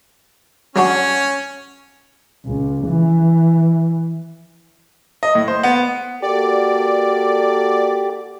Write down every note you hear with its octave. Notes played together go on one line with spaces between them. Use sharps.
F#3 C#4 D4 F#4
C#2
E3
D#5
A2
C5
B3
A#3 F#4 G4 A4 D5